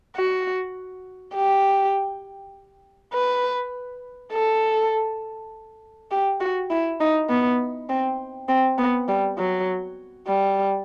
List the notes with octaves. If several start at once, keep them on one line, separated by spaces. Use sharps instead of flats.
F#4
G4
B4
A4
G4
F#4
E4
D#4
B3
C4
C4
B3
G3
F#3
G3